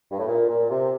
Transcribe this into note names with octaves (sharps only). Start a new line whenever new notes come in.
G2
A2
A#2
A#2
C3